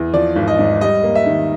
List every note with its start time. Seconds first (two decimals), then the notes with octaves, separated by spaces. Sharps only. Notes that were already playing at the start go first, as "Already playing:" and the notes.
Already playing: E2
0.13 F3 D5
0.36 G#1
0.48 D#5
0.59 G#2
0.81 G3 D#5
1.03 A#3
1.15 E5
1.26 D#3